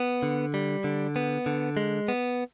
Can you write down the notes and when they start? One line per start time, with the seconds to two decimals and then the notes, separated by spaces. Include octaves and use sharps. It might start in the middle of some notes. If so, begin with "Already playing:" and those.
Already playing: B3
0.23 D3
0.54 G3
0.84 D3
1.16 B3
1.46 D3
1.77 G#3
2.08 B3